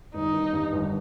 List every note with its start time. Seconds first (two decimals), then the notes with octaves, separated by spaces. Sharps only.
0.14 G1 D#4
0.33 D#3
0.53 G2
0.73 G1